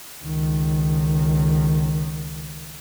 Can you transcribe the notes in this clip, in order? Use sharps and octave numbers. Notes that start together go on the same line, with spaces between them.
C#2 D#3